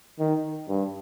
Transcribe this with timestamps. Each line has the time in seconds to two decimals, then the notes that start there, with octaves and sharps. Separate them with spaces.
0.19 D#3
0.69 G2